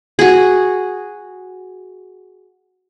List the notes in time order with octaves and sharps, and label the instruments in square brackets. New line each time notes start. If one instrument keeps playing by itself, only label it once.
[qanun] F#4 G#4